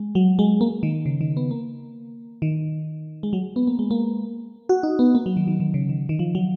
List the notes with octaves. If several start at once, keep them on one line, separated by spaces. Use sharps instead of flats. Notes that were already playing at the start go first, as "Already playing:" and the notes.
Already playing: G#3
F#3
G#3
A#3
D#3
C#3
D#3
B3
A#3
D#3
G#3
F#3
B3
A#3
G#3
A#3
F#4
D#4
B3
A#3
F#3
D#3
D#3
D#3
C#3
D#3
D#3
F3
F#3